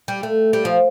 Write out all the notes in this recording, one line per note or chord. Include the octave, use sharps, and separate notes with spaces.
G3
A3
G3
F3